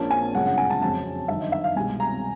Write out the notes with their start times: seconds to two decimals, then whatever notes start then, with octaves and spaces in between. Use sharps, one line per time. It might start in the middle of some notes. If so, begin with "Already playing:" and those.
Already playing: A#1 A#2 F3 A#3 C#4 A5
0.11 G#5
0.35 G1 F#2 C#3 F3 G#3 F#5
0.46 F#5
0.58 G#5
0.70 A5
0.82 F2 C#3 F#3 A5
1.28 G1 F#2 D#3 E5
1.41 D#5
1.52 E5
1.64 F5
1.76 C2 B2 G#3 G#5
2.00 A#5